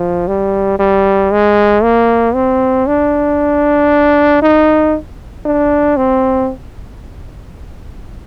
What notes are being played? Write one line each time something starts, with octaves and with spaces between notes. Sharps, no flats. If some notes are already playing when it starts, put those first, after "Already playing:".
Already playing: F3
G3
G3
G#3
A#3
C4
D4
D#4
D4
C4